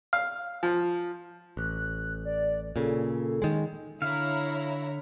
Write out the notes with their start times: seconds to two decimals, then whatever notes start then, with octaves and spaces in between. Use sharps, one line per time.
0.13 F5
0.63 F3
1.57 A1 F#6
2.25 D5
2.76 A#2 C#3 A4
3.42 D#3 G#3
4.02 D3 E4 C#5 F5 A#5